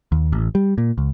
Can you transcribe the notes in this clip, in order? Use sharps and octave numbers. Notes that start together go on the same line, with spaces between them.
D#2
A1
G3
A#2
C#2